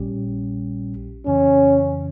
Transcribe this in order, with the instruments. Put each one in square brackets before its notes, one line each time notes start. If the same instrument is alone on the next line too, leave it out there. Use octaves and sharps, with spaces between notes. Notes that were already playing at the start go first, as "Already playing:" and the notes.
Already playing: [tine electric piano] A#1 A#2 G3 C#4 G4
[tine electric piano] F2 C#3 E3 [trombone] C#4